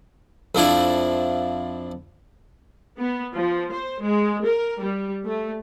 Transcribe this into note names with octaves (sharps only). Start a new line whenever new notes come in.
F2 F3 D4 E4
B3
F3
C5
G#3
A#4
G3
A3